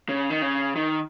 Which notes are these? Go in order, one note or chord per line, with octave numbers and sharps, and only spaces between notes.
C#3
D#3
C#3
D#3